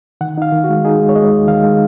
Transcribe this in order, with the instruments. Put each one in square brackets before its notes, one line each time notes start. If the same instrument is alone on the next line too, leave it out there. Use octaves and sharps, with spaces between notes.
[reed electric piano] D#3 F#5
D#4 F5
D#3
F#4
G#3
D#4 G#4
G#3
C#5
G#3 D#5
D#2
D#3 F5
G#3